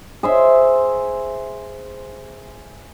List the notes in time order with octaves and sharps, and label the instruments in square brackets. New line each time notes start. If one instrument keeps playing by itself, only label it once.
[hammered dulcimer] G#4 C5 E5